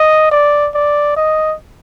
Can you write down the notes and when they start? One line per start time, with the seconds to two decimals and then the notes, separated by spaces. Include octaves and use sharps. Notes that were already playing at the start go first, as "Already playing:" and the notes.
Already playing: D#5
0.31 D5
0.74 D5
1.17 D#5